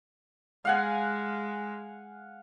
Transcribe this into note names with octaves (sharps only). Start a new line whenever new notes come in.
G#3 F5 F#5 G#5